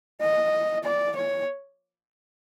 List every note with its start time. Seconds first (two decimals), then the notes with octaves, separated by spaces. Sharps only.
0.21 D#5
0.84 D5
1.16 C#5